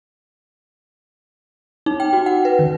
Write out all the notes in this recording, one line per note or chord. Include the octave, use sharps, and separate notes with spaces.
D#4
G5
F#4
F#5
B4
D#3